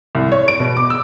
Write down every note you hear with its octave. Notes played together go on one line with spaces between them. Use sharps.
C2
C#5
D7
B2
D6
E6